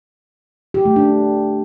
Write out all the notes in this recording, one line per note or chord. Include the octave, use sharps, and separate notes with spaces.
G4
A3
D4